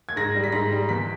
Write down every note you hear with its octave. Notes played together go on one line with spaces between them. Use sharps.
G#6
G#2 A#6
G3
B6
G#2 A#6
G3
E2 B6